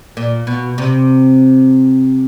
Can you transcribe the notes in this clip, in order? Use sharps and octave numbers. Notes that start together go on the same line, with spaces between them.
A#2
B2
C3